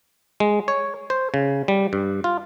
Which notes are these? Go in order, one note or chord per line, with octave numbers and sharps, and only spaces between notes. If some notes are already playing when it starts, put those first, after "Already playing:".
G#3
C#5
C5
C#3
G3
G2
F4